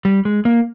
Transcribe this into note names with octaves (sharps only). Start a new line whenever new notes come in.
G3
G#3
A#3